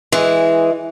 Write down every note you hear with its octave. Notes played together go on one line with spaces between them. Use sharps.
E3 G#3